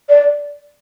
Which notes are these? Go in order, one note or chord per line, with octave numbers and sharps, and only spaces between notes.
D5